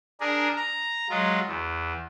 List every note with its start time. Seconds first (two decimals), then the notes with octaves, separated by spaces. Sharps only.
0.21 D4 G#4 A#4
0.57 A#5
1.10 F#3 G#3 F4
1.47 E2